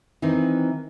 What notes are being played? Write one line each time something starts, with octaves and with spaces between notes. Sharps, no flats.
D#3 E3 C4 D#4